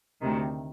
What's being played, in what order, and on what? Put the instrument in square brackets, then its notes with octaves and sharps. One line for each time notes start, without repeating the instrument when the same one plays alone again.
[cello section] D2 C3 D#3